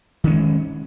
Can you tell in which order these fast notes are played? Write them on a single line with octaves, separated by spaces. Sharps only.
D#3 C#4 G#3